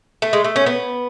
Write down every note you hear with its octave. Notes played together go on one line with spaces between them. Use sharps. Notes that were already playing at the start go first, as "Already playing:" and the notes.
A3
G#3
A3
C#4
B3